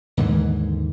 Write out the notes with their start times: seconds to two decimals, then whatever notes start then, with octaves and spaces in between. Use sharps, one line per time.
0.17 D#2 G#2 D3 E3